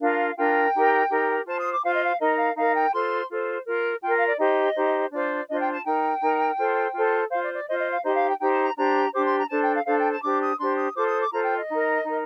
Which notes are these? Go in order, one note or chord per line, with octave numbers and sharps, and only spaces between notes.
D4 F4 A#4 F5
D4 F4 A#4 G5
D#4 G4 A#4
D#4 G4 A#4
F4 C5 A5
D#6
D6
F4 C5 F5
D#5
F5
D#4 A#4 D#5
F5
D#4 A#4 F5
G5
F4 A4 C5 C6
F4 A4 C5
F4 A#4
F4 A#4 G5
F5
D5
D#4 G4 C5 D#5
D#4 G4 C5
D4 F4 C5 D5
D4 F4 C5 D#5
G5
A5
D#4 A#4 G5
D#4 A#4
F4 A4 C5
F4 A4 C5
F4 C5 F5
D5
D5
F4 C5 D#5
D#5
F5
D#4 G4 C5 D#5
F5
G5
D#4 G4 C5 G5
A5
A#5
D4 G4 C5 A#5
D4 G4 C5 D6
C6
A#5
D4 A4 C5 A5
G5
F5
D4 A4 C5 F5
G5
A5
D4 G4 C5 D6
D#6
D4 G4 C5 C6
D#6
F4 A4 C5 D6
D#6
D6
F4 A4 C5 A#5
G5
D#5
D#4 A#4
D#4 A#4